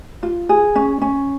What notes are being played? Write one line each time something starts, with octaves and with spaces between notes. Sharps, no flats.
F4
G#4
C#4
C#4